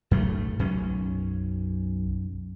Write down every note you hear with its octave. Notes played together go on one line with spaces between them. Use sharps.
B1 F#2 A3
F#2 C#4